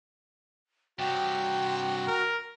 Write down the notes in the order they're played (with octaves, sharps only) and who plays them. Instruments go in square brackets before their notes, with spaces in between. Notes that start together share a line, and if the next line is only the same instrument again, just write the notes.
[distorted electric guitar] G2 C3 [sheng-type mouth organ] F#4 [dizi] G5
[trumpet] A#4